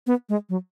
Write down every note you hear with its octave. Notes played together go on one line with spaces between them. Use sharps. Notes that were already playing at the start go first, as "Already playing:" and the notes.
B3
G#3
F#3